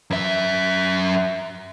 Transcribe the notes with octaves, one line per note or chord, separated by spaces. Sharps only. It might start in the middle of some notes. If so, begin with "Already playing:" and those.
F#2 E5